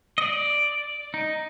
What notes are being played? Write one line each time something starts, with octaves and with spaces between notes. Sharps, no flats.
D#5
D5
D#4